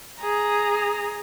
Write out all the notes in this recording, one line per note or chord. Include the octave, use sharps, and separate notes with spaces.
G#4 A#5